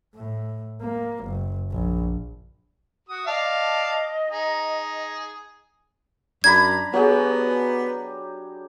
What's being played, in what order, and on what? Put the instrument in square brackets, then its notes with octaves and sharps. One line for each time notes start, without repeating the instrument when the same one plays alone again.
[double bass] A2
A#3
F#1
A#1
[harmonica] F#4 D#6
[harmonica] D5 F5 A5 [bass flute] D#5
[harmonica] D#4 G#4
[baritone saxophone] F#2 [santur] D4 A#5 B5 [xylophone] G#6
[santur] F#3 G4 G#4 [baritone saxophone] B3